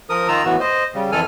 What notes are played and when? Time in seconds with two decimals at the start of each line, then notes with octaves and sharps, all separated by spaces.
0.09 F3 A#4 D#6
0.28 D#3 D#4 F4 A#5 E6
0.45 A2 E3 B3 F#4
0.60 C5 D#5
0.94 C#3 G3
1.12 F2 E3 A4 G#5 F6